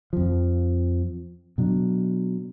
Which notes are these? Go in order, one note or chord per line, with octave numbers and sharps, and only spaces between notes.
F2 F3
B2 F#3 D4